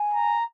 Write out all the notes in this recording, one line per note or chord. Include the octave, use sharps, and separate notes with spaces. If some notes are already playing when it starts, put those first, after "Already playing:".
Already playing: G#5
A#5